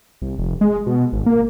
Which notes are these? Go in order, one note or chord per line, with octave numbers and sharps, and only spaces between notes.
C2
F1
G#3
B2
G#1
A#3